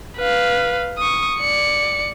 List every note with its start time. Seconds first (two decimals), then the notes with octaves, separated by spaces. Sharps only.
0.17 B4 F5
0.99 C#6 D#6
1.38 D5 C#7